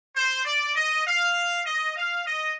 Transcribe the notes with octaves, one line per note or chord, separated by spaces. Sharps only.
C5
D5
D#5
F5
D#5
F5
D#5